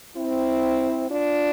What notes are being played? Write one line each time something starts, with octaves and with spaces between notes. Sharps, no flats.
C4 E4
D4 F4